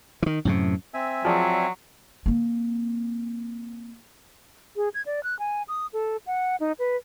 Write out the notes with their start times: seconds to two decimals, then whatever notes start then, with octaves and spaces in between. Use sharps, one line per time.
0.22 D#3 E3
0.45 F#2 A2 C3
0.94 C4 E5 G#5
1.25 F3 F#3 G#4 D5
2.26 A#3 C4
4.76 G#4
4.94 G#6
5.06 D5
5.24 F#6
5.39 G#5
5.68 D#6
5.93 A4
6.27 F#5
6.60 D#4
6.79 B4